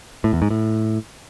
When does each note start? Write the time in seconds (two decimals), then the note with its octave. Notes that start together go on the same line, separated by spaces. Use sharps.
0.24 A2
0.33 E2
0.42 G#2
0.50 A2